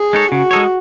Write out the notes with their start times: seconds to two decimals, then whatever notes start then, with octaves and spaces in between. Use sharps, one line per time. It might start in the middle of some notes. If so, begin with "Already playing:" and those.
Already playing: G#4
0.13 G#3 D#4 A4 C#5
0.32 C#3 F#4
0.51 G#3 D#4 A4 C#5